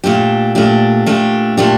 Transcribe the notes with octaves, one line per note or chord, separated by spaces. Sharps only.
A#2 A3 D4 G4
A#2 A3 D4 G4
A#2 A3 D4 G4
A#2 A3 D4 G4